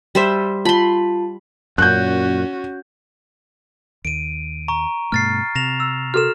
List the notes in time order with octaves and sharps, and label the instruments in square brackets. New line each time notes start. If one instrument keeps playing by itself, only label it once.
[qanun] G3 C5 E5
[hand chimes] F4 A5 [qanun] B5 C6
[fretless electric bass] F#2 A#2 [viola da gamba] C#4 F#4 [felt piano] F#6 G6
[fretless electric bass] D#2 [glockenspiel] D7 D#7
[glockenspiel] A#5 C#6
[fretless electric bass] G2 B2 A3 [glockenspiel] F6 A6 C7
[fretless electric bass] C3 [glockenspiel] A#6 E7 F7
[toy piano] E6
[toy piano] F#4 A4 A#4 [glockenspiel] F6 E7